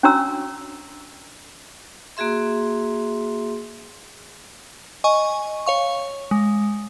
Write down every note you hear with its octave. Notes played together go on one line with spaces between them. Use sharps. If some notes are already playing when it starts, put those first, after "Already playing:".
C#4 D4 F#4 C#5 A#5 E6
A#3 F#4 G#4 E5 C6
D#5 G#5 C#6
C#5 F5 C#6
G#3